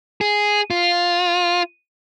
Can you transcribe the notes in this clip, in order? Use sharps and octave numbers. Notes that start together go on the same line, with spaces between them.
G#4
F4